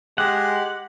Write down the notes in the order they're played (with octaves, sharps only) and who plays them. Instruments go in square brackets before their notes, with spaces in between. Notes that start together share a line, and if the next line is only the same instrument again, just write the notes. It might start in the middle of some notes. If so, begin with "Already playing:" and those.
[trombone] G#3 [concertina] G4 [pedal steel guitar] F#5